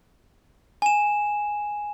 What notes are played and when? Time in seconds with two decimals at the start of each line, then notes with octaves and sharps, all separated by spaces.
0.82 G#5 E7